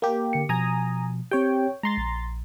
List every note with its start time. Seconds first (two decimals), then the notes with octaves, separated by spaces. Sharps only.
0.02 A#3 G4
0.33 D3 C#7
0.49 B2 F3 G#5 A#5 D#6
1.31 C4 G4 C#5 G5
1.83 G#3 A#5 C6 A6
1.97 A#1